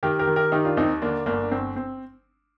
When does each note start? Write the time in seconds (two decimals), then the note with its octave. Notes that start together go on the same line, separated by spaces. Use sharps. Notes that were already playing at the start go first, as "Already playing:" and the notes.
0.03 D#3 G4 A#4
0.19 G4 A#4
0.27 D#3
0.36 G4 A#4
0.52 D#3 D#4 G4
0.65 D4 F4
0.77 D#2 C4 D#4
1.02 D3 A#3 D4
1.26 G1 A#3 D4
1.51 G1 C4
1.76 C4